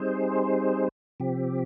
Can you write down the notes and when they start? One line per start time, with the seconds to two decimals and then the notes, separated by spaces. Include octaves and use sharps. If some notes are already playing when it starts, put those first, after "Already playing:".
Already playing: G3 C4 D#4 G#4 C5
1.20 C3 F3 C4 G4